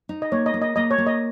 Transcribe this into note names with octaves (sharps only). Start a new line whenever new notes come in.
D#4
D#5
A#3 C#5
D#5
A#3
D#5
A#3 D#5
C#5
A#3
D#5